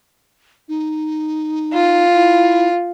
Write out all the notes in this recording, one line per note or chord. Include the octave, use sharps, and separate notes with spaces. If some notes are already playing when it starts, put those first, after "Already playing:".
D#4
F4
E4